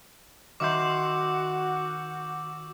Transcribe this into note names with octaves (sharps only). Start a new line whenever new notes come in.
D#3 F#4 E5 C6 D6 E6 G6